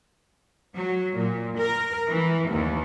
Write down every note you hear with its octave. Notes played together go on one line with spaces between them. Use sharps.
F#3
A#2
A#4
E3
D#2